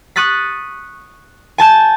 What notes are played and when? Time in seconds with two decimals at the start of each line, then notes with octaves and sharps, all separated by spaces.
0.16 C#6 D#6 F#6 A6 B6
1.58 G#5 A5 G6 E7